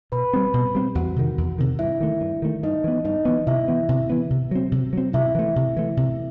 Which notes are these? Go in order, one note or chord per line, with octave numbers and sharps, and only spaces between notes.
B2 B4 B5
G3 C4
B2
G3 C4
E2 F#4 F#5
C3 D#3
E2
C3 D#3
G2 E4 E5
D#3 A3
G2
D#3 A3
G2 D#4 D#5
E3 B3
G2 D#4 D#5
E3 B3
C3 E4 E5
E3 B3
C3
E3 B3
C3
F#3 C4
C3
F#3 C4
C3 E4 E5
E3 A3
C3
E3 A3
C3